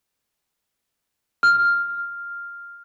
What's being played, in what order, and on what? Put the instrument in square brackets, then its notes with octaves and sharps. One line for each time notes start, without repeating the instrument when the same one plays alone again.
[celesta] F6